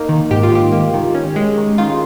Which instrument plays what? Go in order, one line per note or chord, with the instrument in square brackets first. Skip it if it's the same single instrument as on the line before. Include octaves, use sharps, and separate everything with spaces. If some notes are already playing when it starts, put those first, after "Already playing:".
Already playing: [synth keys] A#3 D#4
D#3
G#2 G4
F4
G#2 G4
A#3
D#3
C#4
G#3
D#3
D#3 F4